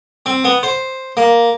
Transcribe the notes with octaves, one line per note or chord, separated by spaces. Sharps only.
C4
B3
C5
A#3